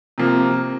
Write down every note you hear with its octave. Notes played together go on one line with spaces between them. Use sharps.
C3 F3 A#3